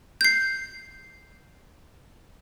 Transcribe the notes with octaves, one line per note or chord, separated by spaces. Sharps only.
G6 C7